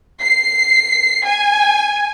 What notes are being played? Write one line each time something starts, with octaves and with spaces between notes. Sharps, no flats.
C7
G#5